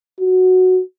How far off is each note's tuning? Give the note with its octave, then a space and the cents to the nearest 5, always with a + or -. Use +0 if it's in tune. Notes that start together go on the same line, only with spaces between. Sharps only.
F#4 +0